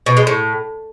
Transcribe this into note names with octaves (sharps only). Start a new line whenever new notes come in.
B2
G#3
A2